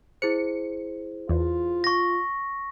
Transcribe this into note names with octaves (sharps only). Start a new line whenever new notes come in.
E4 G#4 C5 C#7
E2 F4
C#6 A#6